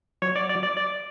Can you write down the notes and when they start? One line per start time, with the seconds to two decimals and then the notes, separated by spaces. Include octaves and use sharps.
0.22 F#3 C#5
0.36 D5
0.50 D5
0.63 D5
0.77 D5